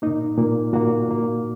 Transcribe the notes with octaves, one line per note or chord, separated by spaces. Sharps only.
A#2 A#3 D#4
A#2 A#3
A#2 A#3 F#4
A#2 A#3